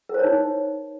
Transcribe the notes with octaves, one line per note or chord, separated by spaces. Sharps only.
D#4 A#4 C5 C#5